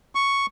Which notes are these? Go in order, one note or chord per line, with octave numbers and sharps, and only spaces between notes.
C#6